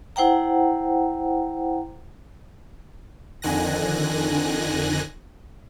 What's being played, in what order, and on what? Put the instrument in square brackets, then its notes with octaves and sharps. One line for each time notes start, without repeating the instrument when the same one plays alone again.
[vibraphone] E4 C5 F#5 G5 A#5
[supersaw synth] F2 D3 D#3 G#5 F#6 A#6